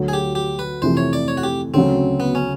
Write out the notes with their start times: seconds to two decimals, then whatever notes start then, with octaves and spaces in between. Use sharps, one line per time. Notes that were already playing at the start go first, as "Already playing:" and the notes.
Already playing: D2 D3 F#3
0.08 G#4
0.13 G4
0.35 G4
0.59 B4
0.82 F2 C3 E3 A3 C5
0.97 C#5
1.13 D5
1.28 C#5
1.37 F#4
1.43 G4
1.74 D2 C#3 F#3 C4
2.20 B3
2.35 C#4